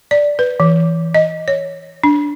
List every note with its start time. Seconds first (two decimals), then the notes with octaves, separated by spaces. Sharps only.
0.11 D5
0.39 B4
0.60 E3
1.14 D#5
1.48 C#5
2.04 D4